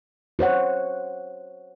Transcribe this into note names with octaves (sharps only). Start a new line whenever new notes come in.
F#4 C5 C#5 F#5